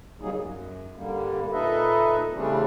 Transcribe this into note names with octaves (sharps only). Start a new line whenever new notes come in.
C#3 F#3 G3 A#3 D#4 G#4
F#2
G2 D3 G3 A#3
A#2 D#4 A4 B4 D#5 E5
C#3 E3 G3 A3 C4 D4